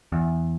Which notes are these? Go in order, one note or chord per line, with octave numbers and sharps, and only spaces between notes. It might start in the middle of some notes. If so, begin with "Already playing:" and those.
E2